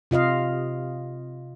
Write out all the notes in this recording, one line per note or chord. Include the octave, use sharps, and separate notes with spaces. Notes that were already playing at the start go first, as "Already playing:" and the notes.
C3 F4 D#5 F5